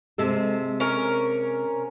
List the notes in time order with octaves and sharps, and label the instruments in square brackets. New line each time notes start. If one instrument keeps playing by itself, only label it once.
[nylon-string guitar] C3 G#3 A4
[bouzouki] C#4 A#4